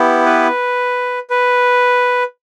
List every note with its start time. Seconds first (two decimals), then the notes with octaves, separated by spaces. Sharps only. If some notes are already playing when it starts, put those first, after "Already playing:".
Already playing: B3 E4 G4
0.26 B4
1.30 B4